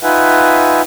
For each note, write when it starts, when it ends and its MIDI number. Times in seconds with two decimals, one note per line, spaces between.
0.03 0.82 63
0.03 0.82 65
0.03 0.82 71
0.03 0.82 76
0.03 0.82 78
0.03 0.82 80